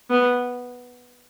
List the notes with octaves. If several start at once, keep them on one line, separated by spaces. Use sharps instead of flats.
B3